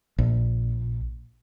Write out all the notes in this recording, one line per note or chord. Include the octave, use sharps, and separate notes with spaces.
A#1